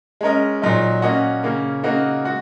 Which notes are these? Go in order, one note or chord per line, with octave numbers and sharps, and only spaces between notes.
G#3 C#4 A#4 D#5
A#2 F#3 D#4
A#3 C#4 F#4 D#5
C#3 A#3 C#4
C#3 A#3 D#4 F#4
G#3 F#4